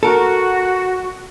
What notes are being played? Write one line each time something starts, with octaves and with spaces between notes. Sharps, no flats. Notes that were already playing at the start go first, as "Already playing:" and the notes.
F#4 A4 A#4